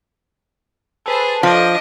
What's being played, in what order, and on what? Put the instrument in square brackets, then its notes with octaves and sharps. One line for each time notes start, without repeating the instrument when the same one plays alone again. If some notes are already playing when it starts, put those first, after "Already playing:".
[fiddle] G#4 C5 [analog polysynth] A4 B4 A5
[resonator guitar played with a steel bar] F3 [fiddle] D4 D#5